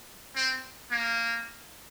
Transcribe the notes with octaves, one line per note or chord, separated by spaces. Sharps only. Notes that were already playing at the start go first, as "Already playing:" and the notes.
C4
A#3